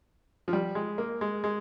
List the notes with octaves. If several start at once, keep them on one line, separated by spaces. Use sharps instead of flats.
F3
G3
G#3
A#3
G#3
G#3